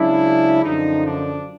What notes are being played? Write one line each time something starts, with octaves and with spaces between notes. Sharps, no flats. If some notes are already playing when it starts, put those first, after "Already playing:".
Already playing: C#2 C#3 F#3 D4 E4
F#2 D3 F3 D#4
D4